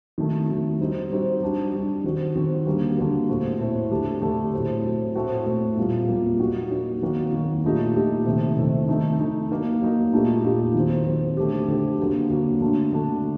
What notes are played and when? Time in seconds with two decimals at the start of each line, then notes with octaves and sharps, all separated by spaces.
0.18 D#3 F#3 A3
0.49 D#3 F#3 A3
0.80 G3 C4 D#4 F#4
1.10 G3 C4 D#4 F#4
1.42 G3 D4 F#4
1.73 G3 D4 F#4
2.04 D#3 F#3 C4 F#4
2.35 D#3 F#3 C4 F#4
2.66 D3 G3 A#3 F#4
2.98 D3 G3 A#3 F#4
3.29 A2 A3 C4 F#4
3.59 A2 A3 C4 F#4
3.91 D3 A3 D4 G4
4.22 D3 A3 D4 G4
4.54 A2 F#3 C4
4.84 A2 F#3 C4
5.15 A2 A3 C4 F#4
5.46 A2 A3 C4 F#4
5.77 A#2 G3 A#3
6.08 A#2 G3 A#3
6.39 F#3 A#3 D#4 F#4
6.70 F#3 A#3 D#4 F#4
7.02 D#3 F#3 A#3 F#4
7.33 D#3 F#3 A#3 F#4
7.64 A#2 A3 D#4 G4
7.95 A#2 A3 D#4 G4
8.26 C3 D#3 A3 C4
8.57 C3 D#3 A3 C4
8.88 D#3 A3 D#4
9.19 D#3 A3 D#4
9.50 F#3 A#3 D#4
9.82 F#3 A#3 D#4
10.13 A#2 A3 D#4 G4
10.44 A#2 A3 D#4 G4
10.74 D#3 F#3 C4
11.06 D#3 F#3 C4
11.37 D3 A3 C4 G4
11.68 D3 A3 C4 G4
11.99 D3 F#3 A#3 F#4
12.30 D3 F#3 A#3 F#4
12.61 D3 A3 D4 F#4
12.92 D3 A3 D4 F#4